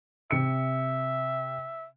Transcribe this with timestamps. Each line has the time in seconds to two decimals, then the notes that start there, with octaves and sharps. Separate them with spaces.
0.31 C3 E5 C#7